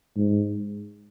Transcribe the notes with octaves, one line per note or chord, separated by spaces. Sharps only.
G#2